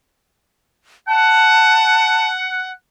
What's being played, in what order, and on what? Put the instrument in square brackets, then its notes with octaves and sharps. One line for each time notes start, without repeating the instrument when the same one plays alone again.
[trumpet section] F#5 [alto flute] A5